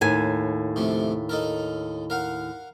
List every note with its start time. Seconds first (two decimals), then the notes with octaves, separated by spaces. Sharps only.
0.01 D#2 A2 G#5
0.76 C3 F3 A3
1.29 D#4 A4 A#4
2.10 A#4 F5 F#5